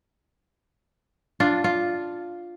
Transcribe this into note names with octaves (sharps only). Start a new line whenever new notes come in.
D4 F4
F4